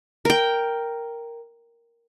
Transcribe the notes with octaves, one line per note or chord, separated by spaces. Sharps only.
A#4 G5